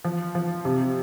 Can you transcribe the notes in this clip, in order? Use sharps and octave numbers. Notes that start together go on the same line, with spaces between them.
F3
F3
C3